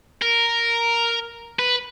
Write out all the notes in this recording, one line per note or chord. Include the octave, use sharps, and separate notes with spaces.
A#4
B4